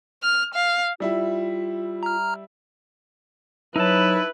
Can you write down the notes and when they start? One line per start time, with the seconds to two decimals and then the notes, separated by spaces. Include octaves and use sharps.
0.23 F6
0.54 F5
1.00 G3 E4 F4 E5
2.03 A#5 F6
3.76 F#3 D#4 E4 B4 A5